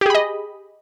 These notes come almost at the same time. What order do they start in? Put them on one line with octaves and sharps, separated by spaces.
G4 G#4 B5 D#5